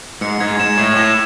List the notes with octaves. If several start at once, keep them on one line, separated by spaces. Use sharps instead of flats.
G#2 C#7
G#2 G#6
G#2 E7
A2 G#6
A2 E7